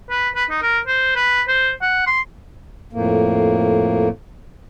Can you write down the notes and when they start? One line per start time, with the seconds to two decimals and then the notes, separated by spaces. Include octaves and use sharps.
0.10 B4
0.35 B4
0.50 D#4
0.62 A#4
0.87 C5
1.16 B4
1.48 C5
1.82 F#5
2.07 C6
2.93 F2 A2 A#3